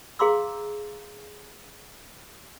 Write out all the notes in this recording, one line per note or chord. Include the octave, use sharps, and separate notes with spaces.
G#4 F5 A#5 C6 D6 E6